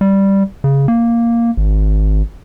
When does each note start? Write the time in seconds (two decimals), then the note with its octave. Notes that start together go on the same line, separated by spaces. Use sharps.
0.01 G3
0.64 C#3
0.88 A#3
1.57 G#1